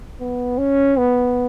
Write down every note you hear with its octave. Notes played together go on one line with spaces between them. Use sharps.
B3
C#4
B3